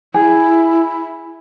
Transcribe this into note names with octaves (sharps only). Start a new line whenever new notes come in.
E4 G#4